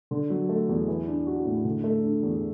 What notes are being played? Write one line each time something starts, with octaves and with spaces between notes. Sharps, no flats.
D3
F#3
A3
E2
E3
D4
F#4
A2
D3
A3
D4
E2